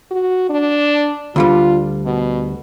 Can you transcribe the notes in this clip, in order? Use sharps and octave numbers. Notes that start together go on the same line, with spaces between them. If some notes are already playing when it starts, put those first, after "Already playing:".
F#4
D4
D2 D3 G3 F4
B2